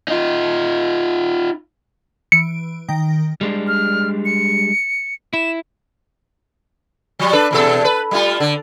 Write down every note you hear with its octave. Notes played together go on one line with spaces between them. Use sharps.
D#4 F4
E3 C#7 D7
D#3 G5 A#6
G3 G#3 D4
F6
C#7
E4 E7
F3 G3
D4 A4 B4
E2 B2 A4
B4
G3 A3 F4
D3